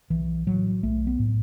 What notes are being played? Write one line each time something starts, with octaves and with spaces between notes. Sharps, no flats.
B1 E3
A2 F#3
B1 A3
B3
A2